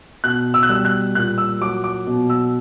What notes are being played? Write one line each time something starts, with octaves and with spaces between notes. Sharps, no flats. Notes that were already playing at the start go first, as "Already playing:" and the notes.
B2 F#6
E6
F#6
G3 E6
F#6
A#2 F#6
E6
F#3 D6
D6
B2
E6